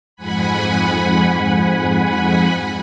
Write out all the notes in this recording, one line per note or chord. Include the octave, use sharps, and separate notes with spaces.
F2 G#2 F#5 G#5 B5